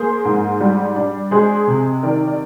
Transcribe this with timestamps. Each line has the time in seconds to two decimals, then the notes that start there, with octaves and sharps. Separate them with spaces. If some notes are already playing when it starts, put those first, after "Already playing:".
Already playing: A#3 G#4 C5
0.25 G#2
0.60 G3
0.96 D4
1.31 G#3 G#4 C5
1.68 C3
2.03 D#3 A#4 D5
2.27 D5